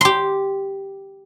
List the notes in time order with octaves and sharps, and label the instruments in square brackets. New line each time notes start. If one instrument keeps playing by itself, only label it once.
[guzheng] G4 C6